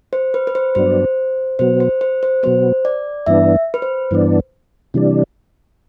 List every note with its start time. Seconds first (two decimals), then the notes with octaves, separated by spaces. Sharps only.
0.13 C5
0.34 B4
0.47 B4
0.55 C5
0.75 G2 F#3 B3 D4 C5
1.59 B2 F#3 B3 C5
1.80 C5
2.01 C5
2.23 C5
2.43 B2 F#3 B3 C5
2.85 D5
3.26 G2 E3 B3 D4 E5
3.74 B4
3.82 C5
4.11 G2 E3 B3 D4
4.94 C3 E3 G3 D4